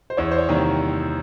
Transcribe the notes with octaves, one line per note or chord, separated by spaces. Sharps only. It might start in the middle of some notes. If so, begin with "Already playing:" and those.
C5
E2 C#5
C5
C#5
C3 D#3 G3 A#3